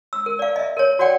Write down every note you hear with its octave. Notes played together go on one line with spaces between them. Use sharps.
E6
A#4
D5 F5
D#5 E5
A#4 C#5
F#4 C#5 D5 F#5 G5